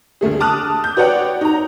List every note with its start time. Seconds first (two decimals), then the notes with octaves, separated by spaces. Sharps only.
0.21 D2 G3 A3 G#4
0.40 A5 D6 D#6 F6 F#6
0.84 G6
0.97 F#4 B4 C#5 D5 F#5 G5
1.41 D#4 A#5